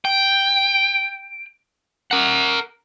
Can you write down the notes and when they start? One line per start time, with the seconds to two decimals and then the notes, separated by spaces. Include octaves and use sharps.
0.05 G5
2.11 A#4 F#5